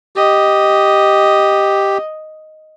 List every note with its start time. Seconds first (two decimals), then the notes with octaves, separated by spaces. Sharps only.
0.16 G4 D#5